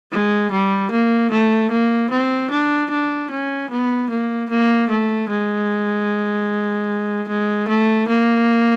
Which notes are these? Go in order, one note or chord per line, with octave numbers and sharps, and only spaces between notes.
G#3
G3
A#3
A3
A#3
C4
D4
D4
C#4
B3
A#3
A#3
A3
G#3
G#3
A3
A#3